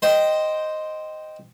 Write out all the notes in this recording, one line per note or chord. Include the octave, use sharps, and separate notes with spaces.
C5 D#5 G5